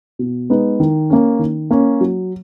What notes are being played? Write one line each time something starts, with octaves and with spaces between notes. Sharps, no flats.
B2
G#3 B3 D#4
D#3
A#3 C#4
D#3
A#3 C#4
F#3